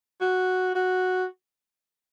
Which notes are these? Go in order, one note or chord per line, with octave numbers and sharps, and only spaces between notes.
F#4
F#4